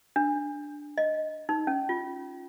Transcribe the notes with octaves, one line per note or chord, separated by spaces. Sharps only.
D4
D#5
D#4
C#4
F4